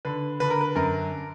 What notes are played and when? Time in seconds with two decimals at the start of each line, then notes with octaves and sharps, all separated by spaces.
0.05 D3 B4
0.40 D3 B4
0.50 A#4
0.61 B4
0.75 F#2 A#4